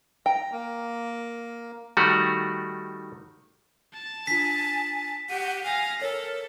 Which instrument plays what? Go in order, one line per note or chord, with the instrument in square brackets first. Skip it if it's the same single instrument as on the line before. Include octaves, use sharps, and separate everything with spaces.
[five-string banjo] G5 [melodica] A#5
[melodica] A#3
[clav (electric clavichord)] D#3 G3 A3 F#4
[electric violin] A5
[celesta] D4 F4 [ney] G#5 [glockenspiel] B6
[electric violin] G4 [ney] F#5 [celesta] D#7
[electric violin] F5 A#6 [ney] G#5
[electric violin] A4 [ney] A#4 [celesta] C#5 E6